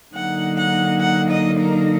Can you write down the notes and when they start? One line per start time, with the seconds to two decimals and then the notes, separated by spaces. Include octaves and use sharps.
0.14 D3 F#3 A#3 D#4 F#5
0.57 F#5
1.01 F#5
1.30 D#5
1.59 A#4